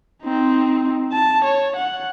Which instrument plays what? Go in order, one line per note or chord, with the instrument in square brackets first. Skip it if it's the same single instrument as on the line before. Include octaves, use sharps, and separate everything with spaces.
[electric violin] C4 D#4
A5
C#5
F#5